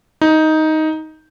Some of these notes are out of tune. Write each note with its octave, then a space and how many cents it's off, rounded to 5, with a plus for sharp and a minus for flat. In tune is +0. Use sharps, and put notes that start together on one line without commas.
D#4 +10